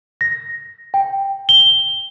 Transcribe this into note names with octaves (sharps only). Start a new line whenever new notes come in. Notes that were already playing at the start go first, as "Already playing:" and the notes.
A#6
G5
G7